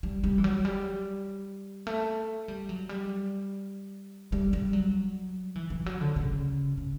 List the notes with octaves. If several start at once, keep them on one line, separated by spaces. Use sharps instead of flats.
G3
G3
E3
F#3
G3
A3
G3
F#3
G3
G3
G3
F#3
E3
E3
F#3
D3
C#3
C#3